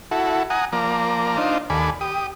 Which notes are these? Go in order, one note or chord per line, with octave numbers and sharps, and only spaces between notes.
E4 F#4 A4
F#5 G#5 A#5 D#6
F3 A#3 D5 A#5
D4 D#4 F4 C5
D#2 A4 D5 G#5 B5
G4 D#6